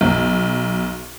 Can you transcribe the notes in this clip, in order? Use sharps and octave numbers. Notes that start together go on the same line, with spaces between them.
B1